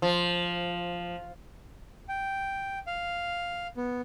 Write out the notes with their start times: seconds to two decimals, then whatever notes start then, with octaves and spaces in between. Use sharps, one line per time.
0.02 F3
2.09 G5
2.87 F5
3.77 B3